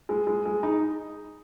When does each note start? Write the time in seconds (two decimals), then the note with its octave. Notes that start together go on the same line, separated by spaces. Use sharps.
0.09 G#3
0.27 G#3
0.46 G#3
0.63 D#4